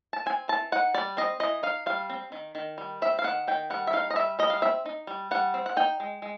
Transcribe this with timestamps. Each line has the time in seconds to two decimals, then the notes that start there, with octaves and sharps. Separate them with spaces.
0.13 A5
0.26 C4 G#5
0.48 E3 A5
0.72 D#4 F#5
0.94 G3 D5
1.17 C4 D#5
1.40 E3 D#5
1.63 D#4 F5
1.86 G3 F5
2.10 C4
2.32 D#3
2.55 D#3
2.78 G3
3.02 C4 E5
3.19 F5
3.24 D#3 F#5
3.47 D#3 G5
3.70 G3 F#5
3.87 E5
3.93 D#4 F5
4.10 D#5
4.16 G3 E5
4.39 G3 D#5
4.50 F5
4.62 C4 E5
4.86 D#4
5.07 G3
5.31 G3 F#5
5.54 C4
5.66 F#5
5.77 D#4 G5
6.00 G#3
6.22 G#3